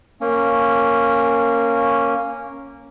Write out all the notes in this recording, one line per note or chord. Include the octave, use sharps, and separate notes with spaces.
A#3 C#4